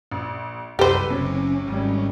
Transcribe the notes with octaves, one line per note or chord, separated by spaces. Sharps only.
A#1
C2 F#2 G4 A4 B4 C5
F#1 C3 C#4
G#1 G3